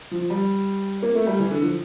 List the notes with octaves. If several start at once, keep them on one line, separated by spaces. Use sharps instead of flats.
F3
G3
A#3
A3
G3
E3
D3
F3